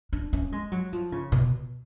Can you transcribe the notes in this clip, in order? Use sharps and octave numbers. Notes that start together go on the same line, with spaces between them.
D4
C#4
G#3
F#3
F3
C#3
B2